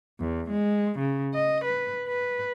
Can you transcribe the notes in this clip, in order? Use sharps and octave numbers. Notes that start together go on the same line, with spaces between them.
E2
G#3
C#3
D#5
B4
B4